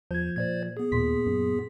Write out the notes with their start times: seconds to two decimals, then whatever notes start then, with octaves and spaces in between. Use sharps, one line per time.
0.11 E2 F3 G6 G#6
0.36 A#2 C5 D5 G#6
0.77 B3 G#4
0.92 D#2 A#2 C6 B6
1.27 F#2